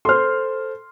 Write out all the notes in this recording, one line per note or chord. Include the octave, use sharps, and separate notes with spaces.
A4 C5 C6 F6